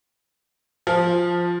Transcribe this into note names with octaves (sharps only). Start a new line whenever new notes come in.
F3